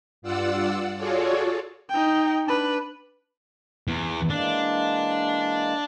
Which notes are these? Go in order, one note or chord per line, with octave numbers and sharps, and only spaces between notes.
G2 F4 D5 F#5 E6
F4 F#4 G#4 A4 C#5 D5
D#4 G5
D4 B4
E2
E3 G#3 A#3 D4